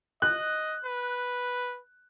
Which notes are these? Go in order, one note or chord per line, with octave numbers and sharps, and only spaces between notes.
D#5 F#6
B4